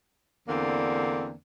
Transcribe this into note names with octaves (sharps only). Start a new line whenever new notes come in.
E2 D3 A#3 C4 D4